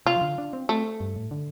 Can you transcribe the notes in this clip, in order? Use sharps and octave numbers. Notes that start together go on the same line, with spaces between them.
C3 F4
F3
D3
D4
C4
A3 C4
G2
A2
D3